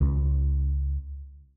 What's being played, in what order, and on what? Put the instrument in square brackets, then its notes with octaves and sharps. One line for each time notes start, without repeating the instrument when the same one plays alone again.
[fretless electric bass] C#2